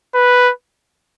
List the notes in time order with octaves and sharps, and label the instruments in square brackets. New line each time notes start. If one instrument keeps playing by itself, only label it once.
[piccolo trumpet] B4